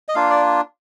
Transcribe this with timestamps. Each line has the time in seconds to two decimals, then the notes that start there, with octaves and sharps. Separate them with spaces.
0.08 D#5
0.15 A#3 D4 F4 F5
0.30 D5